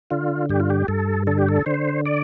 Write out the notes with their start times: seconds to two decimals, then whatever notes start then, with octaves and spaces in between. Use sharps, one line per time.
0.11 D3 F4
0.49 G2 G4
0.60 F4
0.70 G4
0.88 G2 A4
1.27 D3 A4
1.38 G4
1.49 A4
1.66 D3 C5
2.06 D5